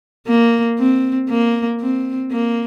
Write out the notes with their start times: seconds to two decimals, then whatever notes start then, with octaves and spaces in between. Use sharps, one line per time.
0.27 A#3
0.79 C4
1.30 A#3
1.81 C4
2.32 A#3